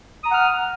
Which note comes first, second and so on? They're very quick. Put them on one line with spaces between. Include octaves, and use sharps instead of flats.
D#6 A#5 F#5 F6